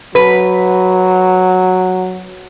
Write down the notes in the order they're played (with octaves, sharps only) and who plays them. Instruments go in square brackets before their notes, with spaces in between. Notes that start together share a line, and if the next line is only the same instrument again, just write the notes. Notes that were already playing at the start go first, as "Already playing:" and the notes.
[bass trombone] F#3 [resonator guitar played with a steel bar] B4